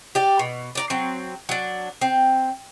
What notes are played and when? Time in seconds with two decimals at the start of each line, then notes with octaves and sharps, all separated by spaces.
0.15 G4 D5
0.39 B2
0.75 D4 D5 A#5
0.90 F#3 C4
1.49 F#3 D4
2.01 C4